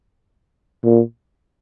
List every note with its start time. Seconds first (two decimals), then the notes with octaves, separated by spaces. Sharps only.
0.84 A#2